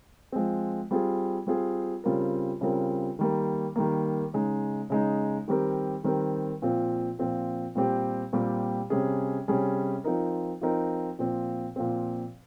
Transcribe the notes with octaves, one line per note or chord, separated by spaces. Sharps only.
F3 G#3 C4
G3 C4 F4 G#4
G3 C4 F4 G#4
C#3 G3 C4 F4 A#4
C#3 G3 C4 F4 A#4
D#3 G3 A#3
D#3 G3 A#3
C#3 G#3 D#4
C#3 G#3 D#4
D#3 G3 C4 G4 A#4
D#3 G3 C4 G4 A#4
A#2 F3 C4 F4
A#2 F3 C4 F4
A#2 G3 C4 G4
A#2 G3 C4 G4
C3 G3 C#4 G#4
C3 G3 C#4 G#4
F3 C4 D#4 A#4
F3 C4 D#4 A#4
A#2 F3 C4
A#2 F3 C4